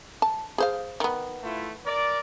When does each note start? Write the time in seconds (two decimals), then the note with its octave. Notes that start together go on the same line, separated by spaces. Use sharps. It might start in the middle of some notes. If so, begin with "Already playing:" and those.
0.22 A5
0.58 G#4 C5 F5
1.00 D#3 B3
1.43 A3 E4 F4
1.85 A#4 D5